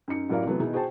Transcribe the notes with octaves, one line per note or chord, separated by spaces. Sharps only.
F#2 D#4 C#7
A1 F#3 E4 A#4 D5 F5
C3 E3 F#3 A3 B3
B2 D#3 D#4 E4 G#4
F#4 G#4 C5 G5 A5